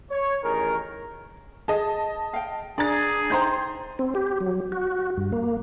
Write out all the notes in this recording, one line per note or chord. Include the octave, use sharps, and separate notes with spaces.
C#5
A1 D#3 G#4 A#4
G#4 D#5 A5
F5 G5
D4 G#4 A#5 A6
D#4 C5 G5 A#5 C6 G6
C4
G4
F#3
F#4
G2
A#3